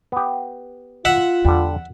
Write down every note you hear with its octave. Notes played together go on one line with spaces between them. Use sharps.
B3 G4
F4 E5 F#5
E2 D3 G3